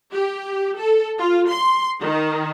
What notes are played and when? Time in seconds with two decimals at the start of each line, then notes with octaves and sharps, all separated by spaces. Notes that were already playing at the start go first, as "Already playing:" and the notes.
0.12 G4
0.77 A4
1.18 F4
1.49 C6
2.00 D#3